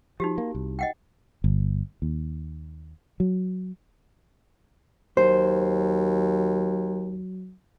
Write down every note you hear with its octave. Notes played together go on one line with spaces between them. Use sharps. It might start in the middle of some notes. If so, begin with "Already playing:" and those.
F3 D#4 F#4 G4
A#3
C2
D#5 F#5 G5
G1
D#2
F#3
D#2 F#3 C5